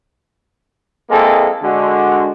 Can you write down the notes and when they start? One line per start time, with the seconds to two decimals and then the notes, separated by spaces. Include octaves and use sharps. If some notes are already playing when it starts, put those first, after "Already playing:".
1.10 G#3 A#3 C4 E4 G#4 A4
1.62 D3 G#3 F#4